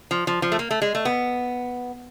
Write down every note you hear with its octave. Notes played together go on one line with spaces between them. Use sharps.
F3
F3
F3
A3
A#3
A3
G#3
A3
B3